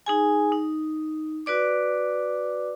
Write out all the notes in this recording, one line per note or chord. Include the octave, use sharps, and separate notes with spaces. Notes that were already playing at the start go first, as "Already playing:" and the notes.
D#4 G#4 G#5
D#4
F#4 B4 D5 D6